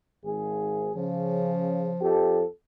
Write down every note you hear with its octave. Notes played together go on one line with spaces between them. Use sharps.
G#1 G#4
C#3 F3
F2 G4 A4